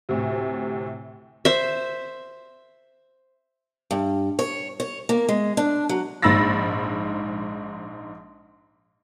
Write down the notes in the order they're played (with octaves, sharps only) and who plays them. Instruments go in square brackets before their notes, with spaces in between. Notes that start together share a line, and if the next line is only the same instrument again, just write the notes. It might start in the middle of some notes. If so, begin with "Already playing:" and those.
[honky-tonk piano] D2 A2 C3
[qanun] C5 E5
[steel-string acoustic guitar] G2
C#5
C#5
A#3
G#3
D4
F#3
[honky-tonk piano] A#1 G#2 B5 E6 A6 A#6